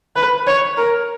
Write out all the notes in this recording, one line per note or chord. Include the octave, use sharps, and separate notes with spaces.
B4
C#5
A#4